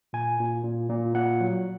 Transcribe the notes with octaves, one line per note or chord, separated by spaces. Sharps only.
A#2 G#5
A#2
A#2
A#2
A#2 F#5
F#3